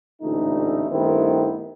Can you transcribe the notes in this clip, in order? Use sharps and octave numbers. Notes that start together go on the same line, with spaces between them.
A1 D2 A#2 A3 D#4
G2 D#3 A3 B3 C4 E4